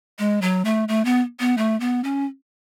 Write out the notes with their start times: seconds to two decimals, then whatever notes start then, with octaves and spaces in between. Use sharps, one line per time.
0.19 G#3
0.42 F#3
0.65 A3
0.88 A3
1.05 B3
1.40 B3
1.58 A3
1.80 B3
2.04 C#4